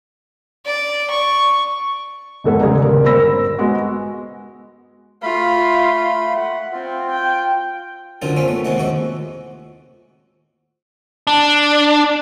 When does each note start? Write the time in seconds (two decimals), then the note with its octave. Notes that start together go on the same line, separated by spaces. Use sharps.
0.65 D5
1.10 C#6
2.44 F1 E2 G#2 A4 B4 F#5
2.61 C#3 G3 C4 G#4 D5 A#5
2.79 D#1 C#3 A#4 D5
3.04 G1 A#4 C5 B5 E6 A#6
3.58 G#3 B3 F#4
5.23 A3 F4 B5
6.35 F#5
6.73 C4 F4
7.11 G5
8.22 C2 F#2 D3 F#3 F4
8.36 A3 C4 C#4
8.48 A3 B3
8.65 D#2 C3 G#3 F#5
8.77 F2 A2 F#4
11.27 D4